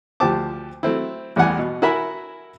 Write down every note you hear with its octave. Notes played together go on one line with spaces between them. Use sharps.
D2 F3 G4 C5 A5 D6
F#3 A3 C4 E4
A1 E2 G3 G4 F#5 G#5
B2
E4 F#4 A#4 E5 G#5 B5